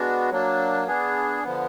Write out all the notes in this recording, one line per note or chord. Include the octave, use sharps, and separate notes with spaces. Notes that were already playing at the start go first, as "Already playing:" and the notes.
Already playing: G#3 B3 D4 F#4
F#3 A#3 D4
B3 D4 G#4
D3 F3 B3